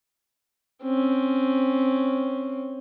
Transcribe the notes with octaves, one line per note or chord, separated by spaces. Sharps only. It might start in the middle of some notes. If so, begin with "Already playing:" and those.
C4 C#4